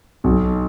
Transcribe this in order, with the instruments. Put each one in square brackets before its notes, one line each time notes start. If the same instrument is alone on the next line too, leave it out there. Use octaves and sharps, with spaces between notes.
[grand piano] B1